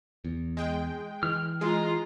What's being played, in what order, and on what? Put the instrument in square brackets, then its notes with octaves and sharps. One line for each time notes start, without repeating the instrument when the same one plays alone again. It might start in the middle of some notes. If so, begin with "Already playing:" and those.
[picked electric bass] E2
[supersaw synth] G#3 G5
[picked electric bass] E3 [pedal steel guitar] F6
[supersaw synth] G#3 [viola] F4 A#5